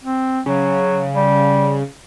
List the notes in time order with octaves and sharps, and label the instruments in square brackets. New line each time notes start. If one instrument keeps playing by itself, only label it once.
[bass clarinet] C4
[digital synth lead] C#3 [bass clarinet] F#3
[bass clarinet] G3